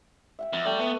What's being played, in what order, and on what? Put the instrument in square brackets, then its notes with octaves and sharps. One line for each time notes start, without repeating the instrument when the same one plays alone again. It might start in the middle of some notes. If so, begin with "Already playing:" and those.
[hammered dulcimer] E5 F#5 G5
[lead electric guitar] F2
[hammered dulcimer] A3 [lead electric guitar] D5 G5
[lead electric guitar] B3